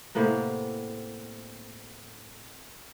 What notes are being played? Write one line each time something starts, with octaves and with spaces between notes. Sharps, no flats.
A2 C3 A#3 B3